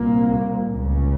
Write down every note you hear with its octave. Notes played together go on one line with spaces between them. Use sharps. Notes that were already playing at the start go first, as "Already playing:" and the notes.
Already playing: C2 A#2 A#3
C#2 C#3